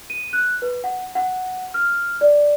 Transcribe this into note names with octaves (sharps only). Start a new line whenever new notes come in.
D#7
F#6
B4
F#5
F#5
F6
D5